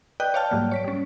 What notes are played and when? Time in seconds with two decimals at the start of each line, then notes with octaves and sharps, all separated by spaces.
0.20 B4 D5 D#5 G5 F#6 G6
0.34 C#5 D5 F5 G5 A5 F6
0.51 G#2 F#3 G3 A#3
0.71 C#5 B6 D7
0.84 G3 C#4